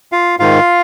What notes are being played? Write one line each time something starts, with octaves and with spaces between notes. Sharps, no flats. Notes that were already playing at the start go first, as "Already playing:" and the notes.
F4 F5
G#2 D#3 F4 F5